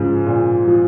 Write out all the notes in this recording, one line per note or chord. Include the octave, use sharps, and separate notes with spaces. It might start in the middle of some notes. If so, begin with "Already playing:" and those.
Already playing: G#2 C#3 F3
A#2
F3